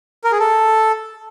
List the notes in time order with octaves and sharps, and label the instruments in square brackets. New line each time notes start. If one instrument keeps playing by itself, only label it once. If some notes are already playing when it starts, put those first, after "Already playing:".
[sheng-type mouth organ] A#4
G#4
A4